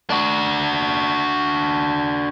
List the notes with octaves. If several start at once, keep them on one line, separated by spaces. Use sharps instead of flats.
D4 F#4